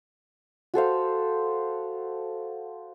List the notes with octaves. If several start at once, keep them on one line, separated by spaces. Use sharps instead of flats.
F#4 A4 C5 F5